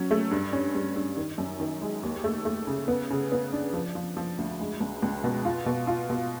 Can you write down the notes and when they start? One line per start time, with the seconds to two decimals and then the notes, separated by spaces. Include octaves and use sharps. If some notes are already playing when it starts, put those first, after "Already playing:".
Already playing: F#3 C#4
0.11 A3
0.31 G2
0.53 C#4
0.75 G2
0.96 G2
1.17 D#3
1.38 F#2
1.60 D#3
1.82 G#3
2.03 D#2
2.24 A3
2.45 A3
2.67 C#3
2.88 B3
3.10 C#3
3.32 B3
3.53 D4
3.73 F3
3.95 F3
4.17 F3
4.38 D2
4.60 G#3
4.80 C#2
5.02 C#2
5.24 B2
5.45 F4
5.66 B2
5.87 F4
6.10 B2